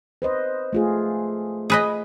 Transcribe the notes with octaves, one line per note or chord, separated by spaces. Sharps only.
B4 C5 D#5
A3 F4 G#4
G#4 B4 D#5